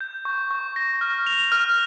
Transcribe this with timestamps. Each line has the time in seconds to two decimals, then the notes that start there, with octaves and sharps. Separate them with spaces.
0.01 G6
0.25 C#6
0.51 C#6
0.76 A#6
1.01 F6
1.26 F7
1.52 F6